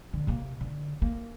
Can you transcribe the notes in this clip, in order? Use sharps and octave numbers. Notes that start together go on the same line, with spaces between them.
D3
C3 A#3
D3
A#3